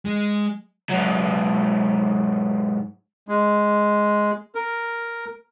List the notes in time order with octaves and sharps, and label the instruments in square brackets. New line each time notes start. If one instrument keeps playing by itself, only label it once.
[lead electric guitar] G#3
[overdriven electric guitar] G#2 F#3
[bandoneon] G#3
A#4